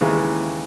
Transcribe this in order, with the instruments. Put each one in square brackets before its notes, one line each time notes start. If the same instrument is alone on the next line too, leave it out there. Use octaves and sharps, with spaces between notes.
[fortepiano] D#2 C#3 E3 G#3